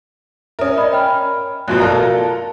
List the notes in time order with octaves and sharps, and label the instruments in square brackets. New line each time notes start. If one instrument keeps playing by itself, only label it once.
[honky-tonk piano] C#4 A#4 [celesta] E5 D#6
[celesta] D5 D#5 B5
G5 B5 F6
[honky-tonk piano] A1 F#2 B2 [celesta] F4 F#4 F#6
[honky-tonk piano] A4 A#4 A#5 [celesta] D5 F5